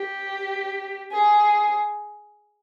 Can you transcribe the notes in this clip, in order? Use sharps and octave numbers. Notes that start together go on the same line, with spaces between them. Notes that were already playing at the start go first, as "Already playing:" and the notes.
Already playing: G4
G#4